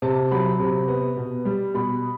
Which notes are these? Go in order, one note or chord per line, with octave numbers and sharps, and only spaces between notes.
C3 A5
F#3 B5
C3
B3
B2
G3
B2 B5